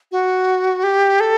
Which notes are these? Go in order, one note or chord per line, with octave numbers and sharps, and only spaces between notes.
F#4
G4
A4